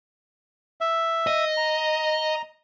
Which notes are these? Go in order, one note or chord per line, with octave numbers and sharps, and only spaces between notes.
E5
D#5
A#5